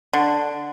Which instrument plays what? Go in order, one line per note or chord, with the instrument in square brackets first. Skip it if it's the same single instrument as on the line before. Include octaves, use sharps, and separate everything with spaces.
[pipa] D3